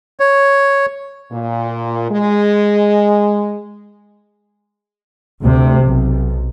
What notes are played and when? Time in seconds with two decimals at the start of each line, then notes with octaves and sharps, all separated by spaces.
0.20 C#5
1.32 A#2
2.10 G#3
5.42 D2 C3
5.83 B1